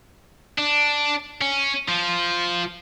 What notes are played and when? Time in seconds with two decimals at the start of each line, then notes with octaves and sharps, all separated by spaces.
0.58 D4
1.42 C#4
1.89 F3